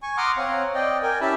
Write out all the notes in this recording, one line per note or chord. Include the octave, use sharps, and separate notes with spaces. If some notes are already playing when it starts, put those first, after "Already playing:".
G#5 C#6
F#5 A#5 C6 D6 D#6 F6
C4 C#5 F5 F#5
D5 D#5 G5
A#4 G5 G#5
C#4 E4 G4 E5 A5 B5